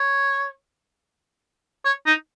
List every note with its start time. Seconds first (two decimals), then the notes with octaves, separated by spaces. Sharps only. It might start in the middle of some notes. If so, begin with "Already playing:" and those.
Already playing: C#5
1.85 C#5
2.07 D#4